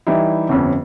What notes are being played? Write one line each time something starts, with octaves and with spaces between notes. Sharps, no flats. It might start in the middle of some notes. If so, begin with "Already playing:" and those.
E3 G3 D#4 E4
G1 F2 C#4